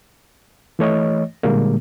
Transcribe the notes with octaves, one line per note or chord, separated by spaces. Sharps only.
E3 A3 C#5 D#5
A#2 D3 G3 G#3 A#3